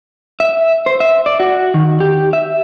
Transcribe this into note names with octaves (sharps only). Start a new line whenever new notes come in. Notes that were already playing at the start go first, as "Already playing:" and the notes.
E5
C5
E5
D5
F#4
D#3
G4
E5